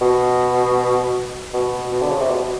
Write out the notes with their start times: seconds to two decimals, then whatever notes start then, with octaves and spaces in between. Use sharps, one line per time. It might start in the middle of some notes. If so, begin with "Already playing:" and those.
0.01 B2
1.54 B2
1.92 B2
2.02 D3
2.12 C#3
2.20 C3
2.30 B2